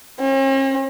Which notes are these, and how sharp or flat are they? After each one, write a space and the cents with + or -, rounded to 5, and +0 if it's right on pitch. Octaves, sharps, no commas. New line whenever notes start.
C#4 -45